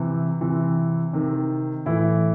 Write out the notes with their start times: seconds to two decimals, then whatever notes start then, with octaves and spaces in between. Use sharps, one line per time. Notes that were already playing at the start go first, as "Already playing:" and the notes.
Already playing: C3 E3
0.41 C3 E3
1.13 C3 D#3
1.86 A2 E3 E4